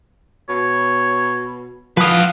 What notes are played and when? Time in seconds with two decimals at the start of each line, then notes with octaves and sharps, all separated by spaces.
0.49 B2 C#5
1.97 E3 F3 B4 F5 F#5 D#6